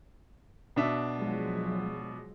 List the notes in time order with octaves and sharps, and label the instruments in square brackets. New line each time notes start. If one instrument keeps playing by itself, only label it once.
[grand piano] B2 D4 E5
[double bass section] F3 F#3 G#3